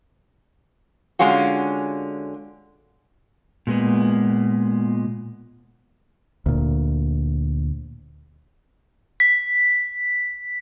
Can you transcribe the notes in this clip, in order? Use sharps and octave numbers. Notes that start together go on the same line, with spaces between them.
D3 G#3 C#4 F4 F#4
A#2 G#3 B3
D2 A#2
B6